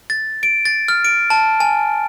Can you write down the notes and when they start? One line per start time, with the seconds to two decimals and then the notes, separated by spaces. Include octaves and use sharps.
0.10 A6
0.43 D7
0.65 A6
0.88 F6
1.05 D7
1.30 A5
1.60 G#5